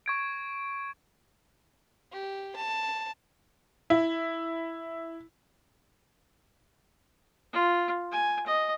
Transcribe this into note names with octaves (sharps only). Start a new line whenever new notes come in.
C#6 G#6 D7
G4
A5
E4
F4
G#5
D#5